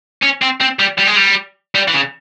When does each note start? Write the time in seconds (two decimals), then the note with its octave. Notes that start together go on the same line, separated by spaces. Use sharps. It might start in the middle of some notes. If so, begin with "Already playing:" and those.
0.22 C#4
0.42 C4
0.61 C4
0.79 G3
0.99 G3
1.07 G#3
1.17 G3
1.75 G3
1.88 E3
1.94 C#3